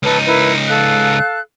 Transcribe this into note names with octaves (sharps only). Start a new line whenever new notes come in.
C#2 D#4 A4 B4
E4 A#4 B4
A4 F5 F#6